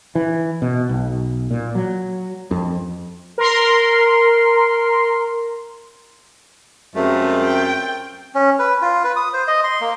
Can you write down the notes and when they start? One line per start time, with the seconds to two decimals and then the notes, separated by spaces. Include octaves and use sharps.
0.15 E3
0.62 B2
0.89 B1
1.51 A#2
1.75 F#3
2.51 F2
3.38 A#4 C6
6.95 F#2 C3 G#3 A3 C4 F4
7.44 G5
8.35 C#4
8.59 B4
8.82 F4
9.04 B4
9.16 D#6
9.33 C5
9.48 D#5
9.64 C6
9.81 A#3